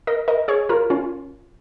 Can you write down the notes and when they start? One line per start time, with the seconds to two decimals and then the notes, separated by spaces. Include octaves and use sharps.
0.07 A#4 D#5
0.28 A#4 D#5
0.48 G#4 C#5
0.69 F4 A#4
0.90 C#4 F4